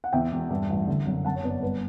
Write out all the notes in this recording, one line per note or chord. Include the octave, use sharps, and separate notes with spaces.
F#5
E2 E5 G5
E1
G2
A1
D3
F#2
F#2 F#5 A5
C#5
G1 B4 D5
C#5
G2 B4